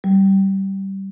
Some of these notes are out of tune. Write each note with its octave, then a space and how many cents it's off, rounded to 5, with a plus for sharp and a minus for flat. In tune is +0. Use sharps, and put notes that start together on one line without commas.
G3 -15